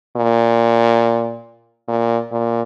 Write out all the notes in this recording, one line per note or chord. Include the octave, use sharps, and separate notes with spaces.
A#2
A#2
A#2